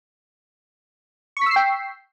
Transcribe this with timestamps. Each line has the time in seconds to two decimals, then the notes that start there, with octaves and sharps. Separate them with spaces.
1.37 C#6
1.41 B6
1.46 E6
1.51 C7
1.56 G5